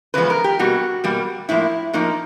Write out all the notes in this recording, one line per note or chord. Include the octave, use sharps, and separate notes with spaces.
E2 C#3 F3 G#3 B3 B4
A#4
G4
B2 G3 A#3 F#4
B2 G3 A#3
A2 F3 A#3 E4
A2 F3 A#3 D#4